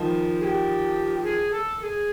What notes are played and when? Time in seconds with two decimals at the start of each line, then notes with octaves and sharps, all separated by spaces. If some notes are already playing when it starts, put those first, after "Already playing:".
Already playing: D#3 F3
0.40 G#4
0.44 G4
1.23 G#4
1.51 A4
1.78 A4
1.83 G#4